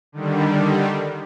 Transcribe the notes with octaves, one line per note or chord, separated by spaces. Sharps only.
D3 D#3 G3